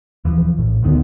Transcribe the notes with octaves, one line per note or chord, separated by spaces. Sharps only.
D#1 E3 F3
A#1 A2
D2 D3 D#3 B3